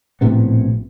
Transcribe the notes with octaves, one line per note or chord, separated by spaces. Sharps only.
A#1 A2 C3 B3